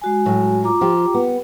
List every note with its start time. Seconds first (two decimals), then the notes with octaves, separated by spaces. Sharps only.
0.02 G#3 F#4 G#5
0.26 A2 F#3
0.63 F4 A#5 D6
0.81 F3 G4
1.14 B3